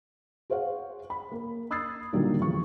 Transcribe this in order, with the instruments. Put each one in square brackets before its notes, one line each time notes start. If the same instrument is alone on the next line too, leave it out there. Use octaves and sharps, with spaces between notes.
[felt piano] G#4 C5 C#5 F5 F#5
B5
A#3
B5 D#6 E6 G#6 A6 C7
A#2 D3 D#3 F#3 G3 A#3
E2 F3 C#6